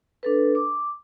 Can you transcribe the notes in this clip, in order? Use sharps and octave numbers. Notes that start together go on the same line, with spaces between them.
D4 A4 B4
D6